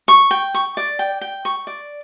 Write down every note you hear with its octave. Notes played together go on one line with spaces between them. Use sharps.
C#6
G5
C#6
D5
G5
G5
C#6
D5